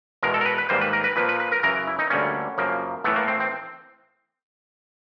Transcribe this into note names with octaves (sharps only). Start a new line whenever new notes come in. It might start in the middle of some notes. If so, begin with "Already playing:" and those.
E2 B2 G#3 A#4
A4
A#4
B4
B4
G#2 D#3 G3 A#3 C5
B4
A#4
B4
A#2 F3 A#3 B4
B4
B4
A#4
F#2 C#3 E3 A#4
E4
D#4
D2 D3 G3 A#3 C#4
F#2 C#3 F3 A#3
A2 E3 A3 B3
A#3
C4
C4